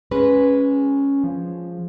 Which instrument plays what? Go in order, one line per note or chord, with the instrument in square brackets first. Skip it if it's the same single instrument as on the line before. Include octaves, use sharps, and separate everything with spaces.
[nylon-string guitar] G#3 B4 [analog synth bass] C#4
[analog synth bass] F3